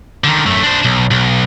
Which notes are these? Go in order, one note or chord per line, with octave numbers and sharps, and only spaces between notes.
D3 D#3
F#2 A3
D4 C5
B1
B1